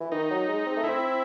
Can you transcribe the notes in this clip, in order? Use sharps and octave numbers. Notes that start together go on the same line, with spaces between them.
E3
D#3 D#4
F#3
G#3
C4
A3
C4 E4